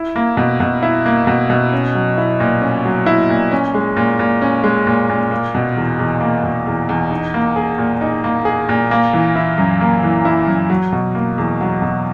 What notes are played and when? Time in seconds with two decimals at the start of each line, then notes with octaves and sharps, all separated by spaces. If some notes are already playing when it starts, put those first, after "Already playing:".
Already playing: E4
0.16 A#3
0.37 B2
0.60 B2
0.83 E4
1.06 A#3
1.27 B2
1.50 B2
1.73 C#4
1.95 F#3
2.18 E4
2.40 A#2
2.62 C#4
2.85 F#3
3.06 E4
3.30 A#2
3.51 C#4
3.74 G#3
3.97 A#2
4.19 A#2
4.41 C#4
4.64 G#3
4.87 A#2
5.09 A#2
5.31 A#3
5.55 B2
5.77 E2
5.99 E2
6.21 A#3
6.43 B2
6.67 E2
6.89 E2
7.11 D#4
7.34 A#3
7.56 G#4
7.78 A#2
8.01 D#4
8.24 A#3
8.45 G#4
8.69 A#2
8.91 A#3
9.13 E3
9.36 E4
9.58 F#2
9.81 A#3
10.03 E3
10.25 E4
10.47 F#2
10.70 F#3
10.92 B2
11.15 A#3
11.38 E2
11.61 F#3
11.82 B2